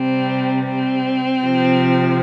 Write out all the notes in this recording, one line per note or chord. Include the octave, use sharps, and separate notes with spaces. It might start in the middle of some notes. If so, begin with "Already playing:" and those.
Already playing: C3 G3 C4
C4
C3 F3